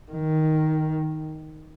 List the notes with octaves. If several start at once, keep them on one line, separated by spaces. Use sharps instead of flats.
D#3